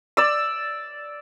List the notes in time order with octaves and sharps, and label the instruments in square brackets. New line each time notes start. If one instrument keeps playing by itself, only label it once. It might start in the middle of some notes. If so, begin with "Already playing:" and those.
[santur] D5 E6